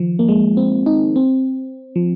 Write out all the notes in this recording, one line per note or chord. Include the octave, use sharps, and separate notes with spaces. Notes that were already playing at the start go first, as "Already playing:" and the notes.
Already playing: D#3 F3
A#3
G#3
C4
D#4
C4
F3